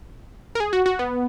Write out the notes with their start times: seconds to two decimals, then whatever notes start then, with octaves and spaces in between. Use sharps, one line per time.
0.55 A#4
0.60 G#4
0.73 F#4
0.86 F#4
0.99 B3